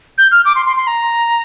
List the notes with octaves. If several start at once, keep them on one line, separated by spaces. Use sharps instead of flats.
G6
F6
D6
C6
C6
C6
A#5